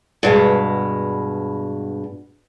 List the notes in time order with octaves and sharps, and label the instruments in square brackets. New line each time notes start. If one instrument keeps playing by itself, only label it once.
[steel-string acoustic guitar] G2 B2 G#3